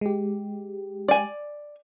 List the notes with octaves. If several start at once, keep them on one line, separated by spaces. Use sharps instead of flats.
G#3 G4
D5 G#5